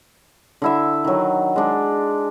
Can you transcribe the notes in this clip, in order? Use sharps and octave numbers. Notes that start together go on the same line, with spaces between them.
D3 E4 E5
D#3 F#3
G#3 D4